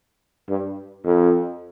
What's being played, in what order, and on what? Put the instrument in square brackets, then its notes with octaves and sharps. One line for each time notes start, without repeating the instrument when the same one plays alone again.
[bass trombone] G2
F2